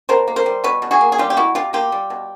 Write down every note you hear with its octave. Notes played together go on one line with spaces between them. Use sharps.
B2 A#4 C5
A#3
A#4 C5
G3
B2 B4 C#5
B2
F#4 G#4
A#3
G#4
G3 F4 G4
G4
B2 E4 F#4
B2 F4 G4
A#3 F4 G4
G3
B2